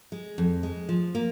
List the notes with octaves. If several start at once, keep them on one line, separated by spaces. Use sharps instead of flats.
G#3
F2
G#3
F3
A#3